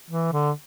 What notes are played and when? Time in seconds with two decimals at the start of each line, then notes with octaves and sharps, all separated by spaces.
0.10 E3
0.32 D3